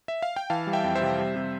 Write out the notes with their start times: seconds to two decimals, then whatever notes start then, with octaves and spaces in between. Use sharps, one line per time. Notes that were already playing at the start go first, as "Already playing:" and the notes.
0.08 E5
0.22 F5
0.36 G5
0.50 E3 F5 A5
0.67 G3
0.73 E5 G5
0.84 F2
0.95 C5 E5
1.02 C3
1.19 G3
1.36 C3